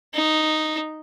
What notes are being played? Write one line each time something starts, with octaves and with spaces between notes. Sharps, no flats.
D#4